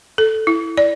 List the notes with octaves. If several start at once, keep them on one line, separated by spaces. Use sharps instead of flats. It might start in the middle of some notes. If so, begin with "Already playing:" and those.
A4
E4
D5